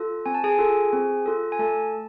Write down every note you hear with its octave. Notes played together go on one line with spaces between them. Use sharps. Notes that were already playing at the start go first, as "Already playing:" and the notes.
Already playing: F4 A4
C4 G#5
A5
G#4 G#5
F4 A4
C4
F4 A4
G#5
A3 A4 A5